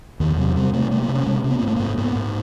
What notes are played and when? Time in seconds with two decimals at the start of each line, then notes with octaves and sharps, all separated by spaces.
0.20 E2 D#3
0.37 C3 F#3
0.56 C3 G3
0.73 C3 A3
0.91 C3 A3
1.03 A#3
1.08 C3
1.15 C#4
1.26 C3 G#3
1.44 C3
1.51 B3
1.59 A#3
1.62 G#2
1.68 A3
1.77 G#2 A#3
1.97 G#2 B3
2.15 G#2